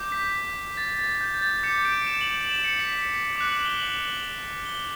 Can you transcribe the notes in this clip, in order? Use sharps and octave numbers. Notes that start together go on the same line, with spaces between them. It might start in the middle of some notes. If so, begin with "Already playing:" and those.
Already playing: D6 G6
B6
A6
A6
G6
A6
D6 G6 C#7
D7
E7
F#7
F#7
E7
C#7
B6
D6 F#6 C#7
F#7
G7
F#7
G7